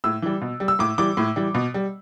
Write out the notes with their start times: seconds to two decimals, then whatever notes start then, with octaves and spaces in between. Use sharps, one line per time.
0.04 A2 E6
0.22 E3 G3
0.41 B2
0.60 G3
0.68 E6
0.79 A2 D6
0.98 E3 G3 D6
1.17 A2
1.36 E3 G3
1.54 B2
1.74 G3